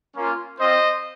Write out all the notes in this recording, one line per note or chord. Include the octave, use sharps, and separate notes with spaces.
A#3 C#4 F4
C4 F4 C5 D#5